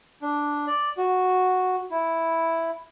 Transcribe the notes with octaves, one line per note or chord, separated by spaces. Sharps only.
D4
D5
F#4
E4